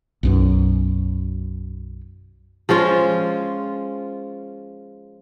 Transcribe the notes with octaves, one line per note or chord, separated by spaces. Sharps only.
B1 F#2 B2
F3 G#3 C#4 F4